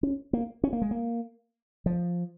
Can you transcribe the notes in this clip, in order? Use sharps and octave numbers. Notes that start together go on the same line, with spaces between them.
C#4
A#3
C#4
A#3
G#3
A#3
F3